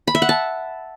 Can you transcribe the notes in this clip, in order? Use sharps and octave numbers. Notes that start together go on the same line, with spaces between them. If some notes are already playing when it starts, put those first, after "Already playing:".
B5
E5
F#5
A5